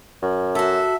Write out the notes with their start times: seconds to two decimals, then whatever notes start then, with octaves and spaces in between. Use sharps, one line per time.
0.22 F#2
0.55 F#4 A4 E5